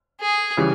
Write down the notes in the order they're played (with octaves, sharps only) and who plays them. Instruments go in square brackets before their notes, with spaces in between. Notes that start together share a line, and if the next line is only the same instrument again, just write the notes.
[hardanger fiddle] G#4
[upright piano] C#3 E3 G3